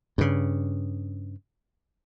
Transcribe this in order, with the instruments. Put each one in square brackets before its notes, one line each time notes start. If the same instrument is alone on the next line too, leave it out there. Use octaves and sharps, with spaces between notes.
[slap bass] G2 C#3